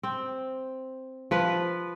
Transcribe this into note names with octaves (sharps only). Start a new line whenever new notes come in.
C4
F3 B4